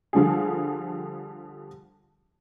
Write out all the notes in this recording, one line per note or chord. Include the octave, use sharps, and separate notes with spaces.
D3 F3 G3 G#4